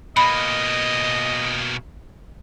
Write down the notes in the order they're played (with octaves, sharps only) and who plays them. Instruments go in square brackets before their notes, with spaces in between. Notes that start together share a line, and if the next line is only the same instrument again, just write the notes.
[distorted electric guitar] B2 A#3 [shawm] D#5 [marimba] B5